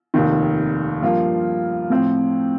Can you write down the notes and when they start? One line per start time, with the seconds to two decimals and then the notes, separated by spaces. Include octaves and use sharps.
0.14 F1 D#2 D#3
1.02 G2 F3 A#3 F4
1.90 A2 F3 C4